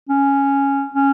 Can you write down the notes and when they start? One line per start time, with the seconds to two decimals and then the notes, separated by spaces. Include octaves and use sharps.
0.09 C#4
0.94 C#4